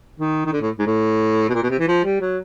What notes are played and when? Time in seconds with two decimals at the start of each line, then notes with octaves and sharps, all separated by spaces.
0.20 D#3
0.46 D#3
0.53 D3
0.61 A2
0.79 G#2
0.86 A2
1.49 B2
1.54 A#2
1.63 B2
1.70 C3
1.79 E3
1.88 F3
2.04 G3
2.21 F#3